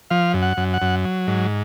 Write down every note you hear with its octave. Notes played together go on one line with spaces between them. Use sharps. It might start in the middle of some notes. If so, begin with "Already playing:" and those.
F3 F5
F#2
F#5
F#2
F#5
F#2
F#3
G#2